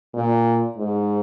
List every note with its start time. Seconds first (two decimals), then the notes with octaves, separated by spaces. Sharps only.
0.14 A#2
0.77 G#2